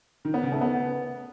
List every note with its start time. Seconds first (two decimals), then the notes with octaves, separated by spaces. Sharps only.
0.25 D#3
0.34 B3
0.43 C#3
0.52 A3
0.61 B3